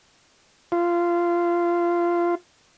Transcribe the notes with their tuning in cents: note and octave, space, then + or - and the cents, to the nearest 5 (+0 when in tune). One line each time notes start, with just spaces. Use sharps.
F4 -15